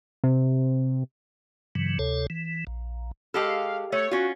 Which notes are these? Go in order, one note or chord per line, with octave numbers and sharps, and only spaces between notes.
C3
G2 C#3 E3 F#3
D2 C3 A4 C#5
E3
A#1
G#3 G4 A4 F5
A3 C#5
C#4 F4 F#4